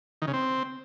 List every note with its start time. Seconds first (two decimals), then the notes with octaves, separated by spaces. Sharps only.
0.22 D#3
0.28 C#3
0.33 C4